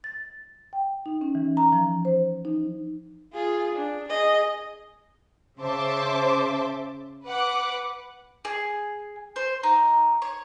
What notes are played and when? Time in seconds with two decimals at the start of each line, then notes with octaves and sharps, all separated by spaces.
0.04 A6
0.73 G5
1.06 D#4
1.21 C#4
1.35 E3
1.57 A#5
1.72 F3
2.05 C5
2.45 D#4
3.33 F4 G#4
3.75 D4
4.08 G#4 D#5
5.59 C#3 C5 E5 A5 D6
7.26 B4 F#5 D6
8.45 G#4
9.36 C5
9.63 D#4
10.22 C#5